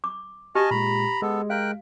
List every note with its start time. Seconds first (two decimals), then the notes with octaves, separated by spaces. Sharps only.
0.04 D6
0.55 G4 D#5 G#5 A5 F6
0.71 A#2 G#3 A#5 B5
1.22 G#3 B3 A4
1.50 A#4 F5 G5 F#6